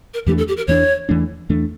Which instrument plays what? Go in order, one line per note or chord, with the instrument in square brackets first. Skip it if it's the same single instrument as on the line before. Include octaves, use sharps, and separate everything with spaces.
[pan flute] A#4
[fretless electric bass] E2 E3 A3 D4 [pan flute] G4
[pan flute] A4
G4
A#4
[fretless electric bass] E2 E3 A3 D4 [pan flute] C#5
[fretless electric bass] E2 E3 A3 D4
E2 E3 A3 D4